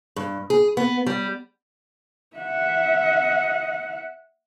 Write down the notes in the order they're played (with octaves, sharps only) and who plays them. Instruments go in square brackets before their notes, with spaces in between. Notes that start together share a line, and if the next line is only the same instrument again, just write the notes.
[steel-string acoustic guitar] G2
G#4
B3
G3
[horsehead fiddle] E5 F#5